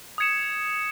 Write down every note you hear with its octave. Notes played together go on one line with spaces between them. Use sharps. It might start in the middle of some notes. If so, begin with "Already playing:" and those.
D#6 G#6 C#7 E7